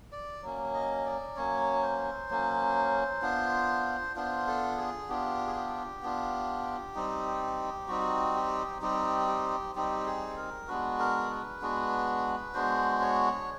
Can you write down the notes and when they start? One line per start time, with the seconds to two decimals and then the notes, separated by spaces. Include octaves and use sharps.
0.12 D5
0.42 F#3 A#3 C#4
0.74 D#5
1.06 D5
1.36 F#3 A#3 C#4 C#5
1.82 C5
2.29 F#3 A#3 C#4
3.22 B3 D4 F4
4.16 B3 D4 F4 C5
4.47 A4
4.77 G#4
5.09 B3 D4 F4 G4
5.47 G#4
5.56 G4
6.03 B3 D4 F4
6.95 G3 C4 D#4
7.88 G3 C4 D#4 F#4
8.35 G4
8.82 G3 C4 D#4 G4
9.28 G4
9.76 G3 C4 D#4 G4
10.06 G#4
10.37 A#4
10.68 G#3 B3 D4 F#4 B4
10.99 A#4
11.30 B4
11.62 G#3 B3 D4 F#4
12.54 G#3 B3 D4 F#4 C5
13.01 C#5